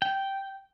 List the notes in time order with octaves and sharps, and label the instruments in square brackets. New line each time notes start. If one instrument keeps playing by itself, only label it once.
[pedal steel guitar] G5